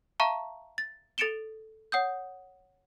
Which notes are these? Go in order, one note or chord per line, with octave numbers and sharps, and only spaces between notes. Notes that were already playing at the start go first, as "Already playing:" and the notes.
E5 F5 A5 A#5 C#6
A6
A4 A6 C#7 D7 E7 G7
C#5 F#5 D#6 G6